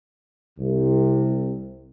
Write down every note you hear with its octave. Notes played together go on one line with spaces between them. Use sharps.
C2 C3